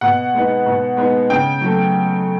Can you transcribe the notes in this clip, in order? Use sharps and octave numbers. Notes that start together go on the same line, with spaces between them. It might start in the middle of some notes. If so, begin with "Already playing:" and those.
B2 F#5
G#3 B3 D#4
B2
G#3 B3 D#4
C#3 G5
F#3 A3